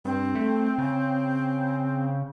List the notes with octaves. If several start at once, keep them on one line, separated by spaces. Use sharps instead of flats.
G2 C4
A3
C#3